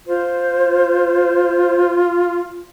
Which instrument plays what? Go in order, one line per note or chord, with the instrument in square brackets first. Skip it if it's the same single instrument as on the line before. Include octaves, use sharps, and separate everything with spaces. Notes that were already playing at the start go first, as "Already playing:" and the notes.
[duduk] F4 [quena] C5